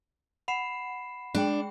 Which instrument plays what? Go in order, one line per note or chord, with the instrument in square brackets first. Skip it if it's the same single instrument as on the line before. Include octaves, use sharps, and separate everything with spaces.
[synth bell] F#5 [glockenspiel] B5 C7 E7
[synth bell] G#3 G#4 G5 [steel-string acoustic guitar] D4